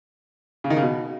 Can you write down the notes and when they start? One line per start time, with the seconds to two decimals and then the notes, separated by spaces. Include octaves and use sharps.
0.64 C#3
0.70 D#3
0.76 C#3
0.83 B2